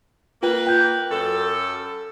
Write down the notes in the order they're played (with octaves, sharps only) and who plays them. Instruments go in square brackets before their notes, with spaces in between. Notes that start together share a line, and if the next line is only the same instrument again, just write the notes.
[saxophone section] A#3 B4 [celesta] F4 G5
[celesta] G5 G6
[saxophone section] F#2 A4